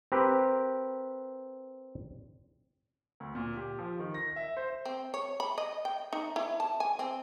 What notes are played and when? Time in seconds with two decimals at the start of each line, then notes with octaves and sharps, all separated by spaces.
0.12 C4 G4 A#4 B4
3.20 D2
3.35 A#2
3.57 G4
3.79 F3
3.99 D#3
4.14 A#6
4.36 E5
4.57 C5
4.86 C4
5.14 C#5
5.40 B5
5.58 D#5
5.85 G5
6.13 D#4
6.36 E4
6.60 A5
6.80 G#5
6.99 C4